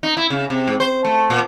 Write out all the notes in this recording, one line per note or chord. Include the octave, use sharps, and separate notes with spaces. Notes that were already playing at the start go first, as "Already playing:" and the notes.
D#4
E4
C#3
C3
G#2
C5
A3
A#2